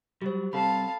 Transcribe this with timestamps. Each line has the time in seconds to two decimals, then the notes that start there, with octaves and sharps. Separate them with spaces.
0.22 F#3 G3 G4 C5
0.53 G3 C4 A4 F5 A5 B5